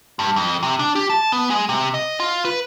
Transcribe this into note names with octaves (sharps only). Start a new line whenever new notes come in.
G2
F2
C3
D4
G4
A5
B3
G#3
C3
D#5
F4
B4